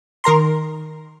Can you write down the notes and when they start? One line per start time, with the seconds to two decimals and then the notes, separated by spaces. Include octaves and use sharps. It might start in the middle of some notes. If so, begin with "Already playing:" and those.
0.24 D#3 A#4 A#5 C6